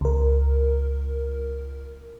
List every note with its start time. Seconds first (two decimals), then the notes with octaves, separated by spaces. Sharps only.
0.01 C#2 A#4